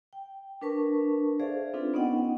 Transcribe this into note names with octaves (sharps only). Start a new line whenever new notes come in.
G5
D4 A#4 B4 A5 C#6
G#4 A4 C5 D5 E5 F5
C4 D4 D#4 F4 A4 B4
B3 C#4 D#4 D#5 F#5 G5